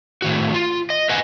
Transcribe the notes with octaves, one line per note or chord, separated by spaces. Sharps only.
A2 D#3 F#4
F4
D#5
B4 D#5 F#5 G#5